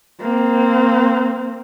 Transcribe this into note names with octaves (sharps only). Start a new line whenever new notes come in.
A#3 C4